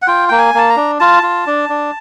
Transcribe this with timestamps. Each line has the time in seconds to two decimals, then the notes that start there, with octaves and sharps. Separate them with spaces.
0.02 F#5
0.08 F4 G5
0.29 A#3 G5
0.38 G#5
0.54 A#3 A5
0.70 A#5
0.76 D4
1.00 F4 A5
1.23 F4
1.47 D4
1.69 D4